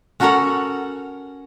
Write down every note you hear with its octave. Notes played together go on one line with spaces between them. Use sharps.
C#4 F#4 A4 A#4 C#5 F#5